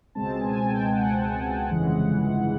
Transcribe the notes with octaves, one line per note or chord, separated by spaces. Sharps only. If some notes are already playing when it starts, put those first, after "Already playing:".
C#2 B2 G#3 C4 A5
G#5
G5
F#5
G1 F2 C#3 E3 G#3